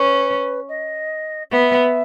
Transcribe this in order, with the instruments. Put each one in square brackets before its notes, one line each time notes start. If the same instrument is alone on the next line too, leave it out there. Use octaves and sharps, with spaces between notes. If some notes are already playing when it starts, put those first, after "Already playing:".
Already playing: [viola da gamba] C#4 [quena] B4
[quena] D#5
[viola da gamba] B3 [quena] E5